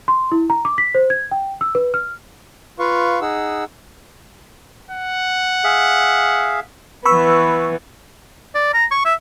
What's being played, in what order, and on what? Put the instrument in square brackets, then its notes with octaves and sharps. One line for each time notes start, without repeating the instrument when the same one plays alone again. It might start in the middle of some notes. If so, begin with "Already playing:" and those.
[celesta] C6
E4
A#5
D6
B6
C5
G#6
G5
E6
B4
F6
[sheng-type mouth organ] F4 B4 F5 C#6
D#4 G#4 F#5 E6
[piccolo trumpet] F#5
[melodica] G#4 E5 F5
[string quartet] E3 B3 [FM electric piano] B5 C#6 E6
[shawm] D5
A#5
C#6
E5